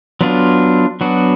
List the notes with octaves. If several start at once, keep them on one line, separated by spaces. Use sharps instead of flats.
F#3 B3 D4 F4
F#3 B3 D4 F#4